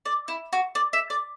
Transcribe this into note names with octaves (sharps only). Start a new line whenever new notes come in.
D5
E4
F#4
D5
E5
D5